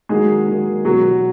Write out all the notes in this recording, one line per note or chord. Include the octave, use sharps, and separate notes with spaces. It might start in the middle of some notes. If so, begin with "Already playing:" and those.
D#2 D#3 F#3 G#3 G#4
D#2 D#3 F#3
E2 B2 F#3 F#4